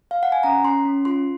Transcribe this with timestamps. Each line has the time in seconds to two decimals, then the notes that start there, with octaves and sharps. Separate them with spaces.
0.11 F5
0.23 F#5
0.32 G#5
0.43 C#4 A#5
0.64 C#4 C6
0.85 C#4
1.05 F4 C6